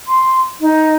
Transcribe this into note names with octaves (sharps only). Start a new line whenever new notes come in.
C6
D#4